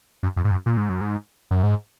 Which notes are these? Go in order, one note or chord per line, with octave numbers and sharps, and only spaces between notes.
F#2
F2
G#2
F#2
A#2
G#2
F#2
G#2
F#2
G#2